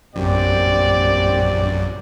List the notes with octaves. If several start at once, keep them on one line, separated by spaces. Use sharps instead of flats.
A#1 F#2 A#2 C4 G4 D5